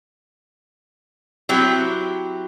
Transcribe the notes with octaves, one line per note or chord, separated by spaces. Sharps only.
F#3 C4 E4 G4